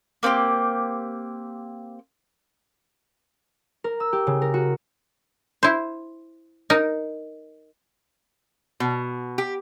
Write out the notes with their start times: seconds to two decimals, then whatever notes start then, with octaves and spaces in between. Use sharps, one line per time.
0.23 A#3 C4 D4 G4
3.84 A#4
4.00 E6
4.13 G4
4.27 C#3
4.42 A#4
4.54 F#4
5.63 E4 C5
6.70 D#4 A#4
8.80 B2
9.38 G4